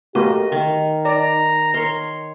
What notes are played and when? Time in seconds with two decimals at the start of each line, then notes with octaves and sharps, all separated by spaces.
0.15 A3 A#3 F#4 G4 D#5
0.52 D#3 D#4
1.05 D5 A#5
1.74 A#4 C#5 C6